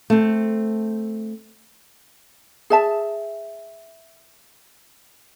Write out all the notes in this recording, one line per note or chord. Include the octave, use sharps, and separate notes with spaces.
A3 C4
G#4 E5 A5